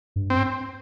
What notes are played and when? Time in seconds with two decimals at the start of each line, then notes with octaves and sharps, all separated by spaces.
0.16 G2
0.30 C4